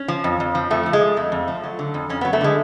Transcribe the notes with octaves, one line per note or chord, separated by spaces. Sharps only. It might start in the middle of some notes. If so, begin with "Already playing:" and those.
Already playing: C#4
F3
F2
F2
F3
F2 A3
F3
G#3
F3
F2 A3
F2
F3
F#3
D3
F2
F2 C#4
F#3 B3
A3
D3 G#3